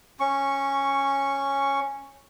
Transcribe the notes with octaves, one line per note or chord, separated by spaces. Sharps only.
C#4 C#6